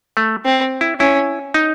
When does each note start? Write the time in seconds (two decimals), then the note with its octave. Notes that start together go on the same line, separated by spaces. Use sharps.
0.17 A3
0.45 C4
0.81 E4
1.00 C#4 E4
1.54 D#4